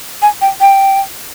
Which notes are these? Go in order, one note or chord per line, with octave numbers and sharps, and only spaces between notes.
G#5
G5
G5